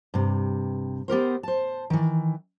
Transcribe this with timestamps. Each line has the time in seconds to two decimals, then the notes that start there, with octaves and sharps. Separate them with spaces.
0.14 G2 C3
1.08 B3 G4 A#4 C5
1.43 C5 A5
1.90 D#3 E3